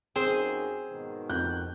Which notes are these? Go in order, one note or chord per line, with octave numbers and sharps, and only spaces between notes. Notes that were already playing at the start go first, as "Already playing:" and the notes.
F#2 C4 D#4 G#4
G#2 B2 D#3
F2 F#6 G6